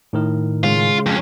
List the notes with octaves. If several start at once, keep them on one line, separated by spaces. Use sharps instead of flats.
A2 D#3 A#4
C#3 G#3 F4
F2 C#4